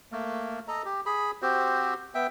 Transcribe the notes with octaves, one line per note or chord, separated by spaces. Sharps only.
A3 A#3
A4 D#5 A#5
G4
G#4 B5
C4 F#4 G4 C5
B3 E5 G5